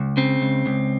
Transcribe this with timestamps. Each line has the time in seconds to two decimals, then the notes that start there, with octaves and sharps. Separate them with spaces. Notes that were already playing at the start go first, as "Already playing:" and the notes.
Already playing: C#2
0.17 C#3 C4
0.42 C#2
0.66 C#2